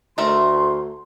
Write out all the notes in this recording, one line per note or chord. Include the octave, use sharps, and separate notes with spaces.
D2 A3 A#4 E5 C6